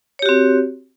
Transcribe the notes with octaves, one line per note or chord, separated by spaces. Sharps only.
C4 F#4 G4 C#5